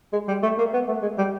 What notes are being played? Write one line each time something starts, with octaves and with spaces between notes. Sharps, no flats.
G#3
G3
A3
A#3
B3
A3
G#3
G3